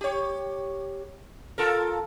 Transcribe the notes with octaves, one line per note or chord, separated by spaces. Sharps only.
G4 C#5
F4 A4 A#4